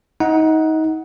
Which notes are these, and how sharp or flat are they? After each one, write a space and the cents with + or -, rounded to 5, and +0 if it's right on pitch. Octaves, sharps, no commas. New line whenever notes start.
D#4 +25 F#5 +0